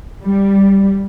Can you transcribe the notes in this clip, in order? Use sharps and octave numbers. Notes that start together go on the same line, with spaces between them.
G3